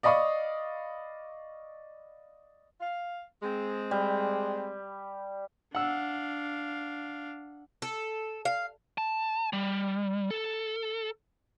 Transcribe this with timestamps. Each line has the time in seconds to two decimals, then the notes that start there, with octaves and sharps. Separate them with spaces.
0.03 D5 D#5 F5 B5 C#6 D#6
2.81 F5
3.42 G#3 C4
3.91 G3
5.75 D4 F5 F#5 E6
7.82 A4
8.45 F5
8.98 A5
9.53 G3
10.31 A4